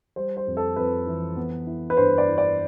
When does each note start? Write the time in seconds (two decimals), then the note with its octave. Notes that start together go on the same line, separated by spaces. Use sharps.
0.16 G3 C5
0.37 C5
0.47 F2
0.57 A4
0.76 F2 B4
1.07 E3
1.37 B3
1.67 E4
1.90 B4
1.97 G2 C5
2.18 D5
2.28 E4
2.38 D5